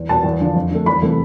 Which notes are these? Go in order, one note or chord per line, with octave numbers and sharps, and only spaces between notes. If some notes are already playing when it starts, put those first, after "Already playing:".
Already playing: E2
B2 B3 A5
E2
D3 F3
F2
D3 A3
E2 B5
C3 E3 A3